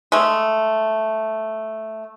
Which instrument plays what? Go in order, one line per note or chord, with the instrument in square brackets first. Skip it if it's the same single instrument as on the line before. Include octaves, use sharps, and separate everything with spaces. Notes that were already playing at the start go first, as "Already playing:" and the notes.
[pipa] G#3 A3